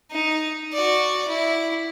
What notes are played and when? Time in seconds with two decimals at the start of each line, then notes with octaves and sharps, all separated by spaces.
0.11 D#4
0.73 F#4 D5
1.28 E4